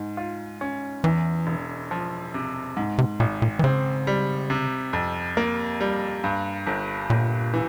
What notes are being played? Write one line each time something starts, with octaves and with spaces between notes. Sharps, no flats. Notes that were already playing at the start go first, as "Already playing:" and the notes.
Already playing: G#2
F4
C#4
E2 E3
E1
F3
C3
G#2
C3
G#1 A#2
A#2
E3
C#3 C4
G3
C3
F2
A#3
G3
G2
G1
G1 A#2
E3